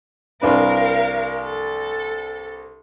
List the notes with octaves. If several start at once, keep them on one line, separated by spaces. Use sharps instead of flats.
C2 D4 A#4 B4 F5
A4